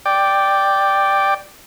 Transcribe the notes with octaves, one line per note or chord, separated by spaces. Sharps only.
D5 G5